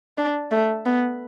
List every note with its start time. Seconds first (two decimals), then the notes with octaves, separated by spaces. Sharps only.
0.18 D4
0.51 A3
0.86 B3